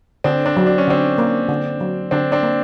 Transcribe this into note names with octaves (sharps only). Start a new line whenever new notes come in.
D3 C4 D4
C4 D4
F#3
D4
C#4
D3 C4 D4
A#3
D3
F#3
D3 C4 D4
C4 D4
A#3